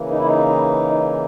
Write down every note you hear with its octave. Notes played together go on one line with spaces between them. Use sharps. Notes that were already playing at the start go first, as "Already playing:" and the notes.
Already playing: C#3 E3 A#3
D#4
E4
D#4